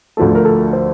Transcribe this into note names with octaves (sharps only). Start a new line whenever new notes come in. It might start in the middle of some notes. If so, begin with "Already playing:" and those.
D2 D3 F3 A3 A4
A#4
A4
C5